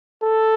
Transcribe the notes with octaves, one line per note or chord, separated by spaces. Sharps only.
A4